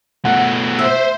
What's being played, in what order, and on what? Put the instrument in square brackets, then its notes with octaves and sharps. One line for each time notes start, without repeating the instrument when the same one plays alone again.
[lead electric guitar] B2 A3 [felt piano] F#5
[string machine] C5 [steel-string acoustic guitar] E5